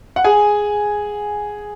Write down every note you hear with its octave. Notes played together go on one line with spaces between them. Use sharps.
F#5
G#4 G#5